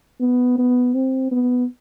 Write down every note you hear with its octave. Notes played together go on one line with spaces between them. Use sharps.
B3
B3
C4
B3